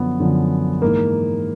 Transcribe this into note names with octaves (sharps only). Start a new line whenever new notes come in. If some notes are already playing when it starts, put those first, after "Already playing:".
Already playing: F#2 D3 F3 B3
F#2 D3 F3
G#2 E3 A#3